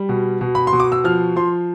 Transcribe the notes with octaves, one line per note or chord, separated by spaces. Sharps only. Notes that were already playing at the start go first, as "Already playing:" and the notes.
Already playing: G3
B2
B2
B5
C6
B2
D6
E6
F3 F6
F3 C6